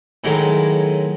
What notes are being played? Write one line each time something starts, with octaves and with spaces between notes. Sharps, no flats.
A2 D#3 F#3 G#3